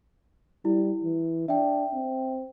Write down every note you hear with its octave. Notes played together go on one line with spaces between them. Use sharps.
G3 E4
E3
D4 E5 G5
C4